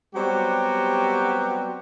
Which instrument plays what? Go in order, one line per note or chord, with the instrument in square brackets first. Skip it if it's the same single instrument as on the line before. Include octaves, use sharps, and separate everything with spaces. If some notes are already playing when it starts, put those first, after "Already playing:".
[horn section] F#3 G3 B3 C4 F#4 G4